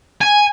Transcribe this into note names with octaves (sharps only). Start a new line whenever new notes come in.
G#5